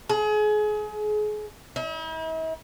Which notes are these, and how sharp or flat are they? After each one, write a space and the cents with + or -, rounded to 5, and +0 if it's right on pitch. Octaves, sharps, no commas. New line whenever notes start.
G#4 +30
E4 -45